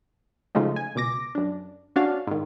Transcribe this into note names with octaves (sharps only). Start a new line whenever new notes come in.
C#3 F3 F#3 G#3 A3 D#4
G#5
C#2 B2 D6 A#6
F#2 D4
C#4 D4 F#4 F5
G#2 D#3